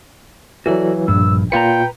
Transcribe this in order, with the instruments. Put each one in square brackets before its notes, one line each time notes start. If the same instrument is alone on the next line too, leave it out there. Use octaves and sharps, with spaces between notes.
[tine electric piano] E3 F#3 [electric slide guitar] F#4 A4 D5
[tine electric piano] A#1 [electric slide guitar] G2 [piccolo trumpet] E6
[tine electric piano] A#2 F4 C#7 [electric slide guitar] B4 A#5 [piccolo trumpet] G5